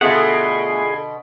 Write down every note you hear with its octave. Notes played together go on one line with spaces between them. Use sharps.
B2 D3 A3 B3 F4 G#4 F#5